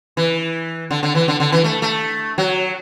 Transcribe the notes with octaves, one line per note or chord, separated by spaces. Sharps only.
E3
D3
D3
E3
D3
D3
E3
A3
A3
F#3